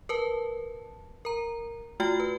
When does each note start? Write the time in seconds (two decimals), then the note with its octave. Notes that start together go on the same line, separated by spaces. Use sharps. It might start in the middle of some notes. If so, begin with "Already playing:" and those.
0.09 A#4 B4 A5
1.25 A#4 A#5
2.00 A3 F4 F#4 G5 F6
2.20 B4